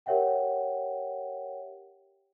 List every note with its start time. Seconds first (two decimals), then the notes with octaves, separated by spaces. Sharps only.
0.06 G4 A#4 C#5 E5 F#5 G5